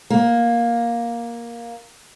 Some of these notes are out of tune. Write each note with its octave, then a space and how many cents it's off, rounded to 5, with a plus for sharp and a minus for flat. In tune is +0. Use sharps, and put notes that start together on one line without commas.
A#3 +10